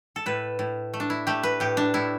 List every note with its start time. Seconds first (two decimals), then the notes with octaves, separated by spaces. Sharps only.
0.16 A4
0.26 A2 B4
0.59 A2
0.94 A3
1.00 D4
1.10 E4
1.27 A3 G4
1.43 B4
1.60 A2 G4
1.77 D4
1.94 A2 E4